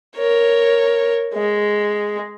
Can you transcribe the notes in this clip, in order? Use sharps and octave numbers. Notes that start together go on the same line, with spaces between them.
A#4 C#5
G#3